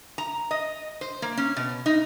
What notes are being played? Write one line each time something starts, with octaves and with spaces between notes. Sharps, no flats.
A#5
D#5
C5
A#3
C#4
B2
D#4